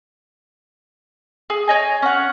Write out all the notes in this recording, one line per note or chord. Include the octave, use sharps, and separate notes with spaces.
G#4
C#5 D#5 G#5
C#4 F#5